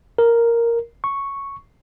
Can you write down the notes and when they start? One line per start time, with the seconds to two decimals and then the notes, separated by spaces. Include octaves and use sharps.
0.18 A#4
1.04 C#6